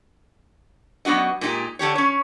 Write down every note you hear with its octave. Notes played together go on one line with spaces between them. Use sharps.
F#2 B3 D4 F#4 D#5
A#2 G#3 D#4 G4
D3 D4 G4 C#5
C#4 C#5